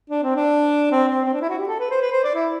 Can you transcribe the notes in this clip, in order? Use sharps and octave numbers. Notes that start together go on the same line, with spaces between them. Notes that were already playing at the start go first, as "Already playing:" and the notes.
D4
C4
D4
C4
C4
C4
D4
E4
F#4
G4
A4
B4
C5
B4
C5
D5
E4